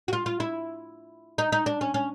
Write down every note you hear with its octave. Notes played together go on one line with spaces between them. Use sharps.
F#4
F4
F4
E4
D#4
D#4
D4
C#4
C#4